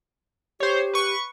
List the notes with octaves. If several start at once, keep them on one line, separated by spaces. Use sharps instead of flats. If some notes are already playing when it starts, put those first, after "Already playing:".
G4 C5 C#5
B4 C#6